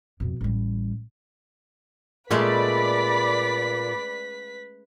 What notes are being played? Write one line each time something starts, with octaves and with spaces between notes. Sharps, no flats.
F2 B2
A1 G3
A#2 G#3 A3 C#4 B4 D5 B5 B6